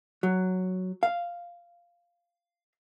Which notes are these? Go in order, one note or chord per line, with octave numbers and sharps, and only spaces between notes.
F#3
F5